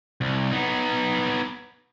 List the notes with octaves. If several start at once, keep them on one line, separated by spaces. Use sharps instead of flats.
C2
B3 D#4